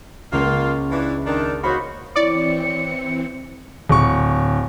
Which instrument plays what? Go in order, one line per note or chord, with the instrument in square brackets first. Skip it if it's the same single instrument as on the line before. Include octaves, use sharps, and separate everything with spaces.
[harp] C#2 [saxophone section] A#3 F4
[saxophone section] E3 D4
D#3 D4
[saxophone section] A#3 D#4 F#4 [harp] C5 C#5 B5
[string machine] E3 C4 [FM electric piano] E4 C#5 [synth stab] D5 [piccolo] C#7
[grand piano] D1 C#6